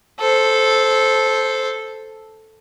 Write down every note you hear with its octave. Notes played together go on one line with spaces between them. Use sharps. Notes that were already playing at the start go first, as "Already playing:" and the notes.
A4 C5